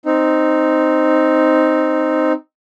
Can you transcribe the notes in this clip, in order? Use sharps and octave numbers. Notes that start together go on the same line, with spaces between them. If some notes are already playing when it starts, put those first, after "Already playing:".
C4 D#4